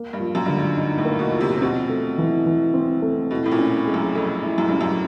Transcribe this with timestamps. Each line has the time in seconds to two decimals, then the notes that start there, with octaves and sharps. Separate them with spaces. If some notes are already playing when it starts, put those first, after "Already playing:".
Already playing: A#3
0.13 G2
0.20 F3
0.35 F#2
0.45 G2 D3
0.56 G#2
0.77 D#4
0.98 A2
1.05 A#3
1.19 B2
1.33 F3
1.40 C3
1.56 C3
1.62 B2 C4
1.89 A3
2.18 E3
2.46 E3
2.74 C4
3.02 A3
3.31 B2 E4
3.46 A2
3.52 A#2
3.59 C#4
3.87 G#3
3.94 F#2
4.15 F2 A4
4.43 E4
4.58 F#2
4.69 G2 C#4
4.81 F#2